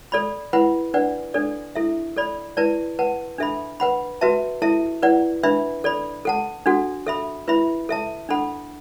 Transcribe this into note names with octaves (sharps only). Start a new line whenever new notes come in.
A4 D5 B5
E4 B4 F#5 B5
D4 B4 D5 F#5
D4 A4 D5
E4 A4 E5
A4 D5 B5
E4 B4 D5 A5
B4 F#5 A5
D4 A4 E5 B5
B4 F#5 B5
F#4 B4 E5 A5
E4 A4 E5 A5
E4 B4 D5 F#5
D4 B4 E5 B5
A4 D5 B5
A4 F#5 A5
D4 F#4 A4 F#5
A4 E5 B5
E4 B4 E5 B5
A4 E5 A5
D4 A4 F#5 B5